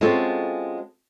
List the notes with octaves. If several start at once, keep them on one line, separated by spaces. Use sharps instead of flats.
G#3 C4 C#4 F4 F#4 A4